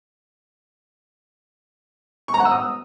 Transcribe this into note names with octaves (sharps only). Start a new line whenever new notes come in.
C#6
A#5
F#5
E6
D#6